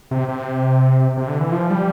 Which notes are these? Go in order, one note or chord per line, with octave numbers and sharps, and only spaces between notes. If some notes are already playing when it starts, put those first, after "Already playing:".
C3
C3
C3
D3
E3
F3
G3